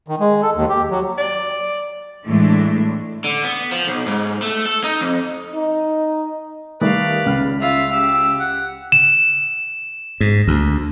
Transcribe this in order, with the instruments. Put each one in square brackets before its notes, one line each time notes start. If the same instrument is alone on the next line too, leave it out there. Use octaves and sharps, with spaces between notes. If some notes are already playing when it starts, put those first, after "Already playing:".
[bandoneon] D#3
G#3
A4
D#2
G4
F#3
[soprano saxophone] D5
[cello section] A2 E3 G#3 A3 D4
[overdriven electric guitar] D3
B3
F3
B1
G#2
A3
A4
D#4
F2
[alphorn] D#4
[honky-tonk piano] D#3 G3 A3 [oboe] B4 [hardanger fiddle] D5 F5
[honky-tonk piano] C#2 F6
[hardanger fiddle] F4 F5 [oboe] E5
[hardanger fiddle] G4 [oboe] E6
[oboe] F#5
[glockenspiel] E7
[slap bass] G#2
D2